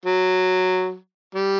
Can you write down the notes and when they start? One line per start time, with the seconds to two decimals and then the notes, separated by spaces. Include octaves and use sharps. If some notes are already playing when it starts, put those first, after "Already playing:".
0.06 F#3
1.35 G3